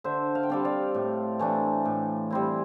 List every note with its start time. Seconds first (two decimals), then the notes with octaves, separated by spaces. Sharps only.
0.04 D3 C5 E5
0.35 F5
0.43 G5
0.50 G3 C4 D5 F5
0.65 D5 F5
0.94 A2
1.39 E3 A3 D4
1.85 A2
2.30 G3 C4 E4